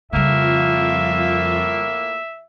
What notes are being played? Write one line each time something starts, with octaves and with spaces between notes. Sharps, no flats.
F2 A2 C#3 G3 A#3 F4 E5